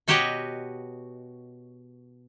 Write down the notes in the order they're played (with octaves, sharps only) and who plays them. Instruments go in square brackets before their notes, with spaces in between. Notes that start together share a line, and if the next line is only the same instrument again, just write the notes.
[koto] B2 F#4 G4 B4 C#5 D#5